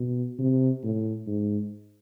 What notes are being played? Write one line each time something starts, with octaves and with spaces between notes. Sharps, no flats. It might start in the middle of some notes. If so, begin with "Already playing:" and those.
Already playing: B2
C3
A2
G#2